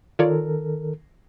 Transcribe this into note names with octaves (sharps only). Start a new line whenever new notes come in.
D#3 F4 A4 A#4 C#5 D5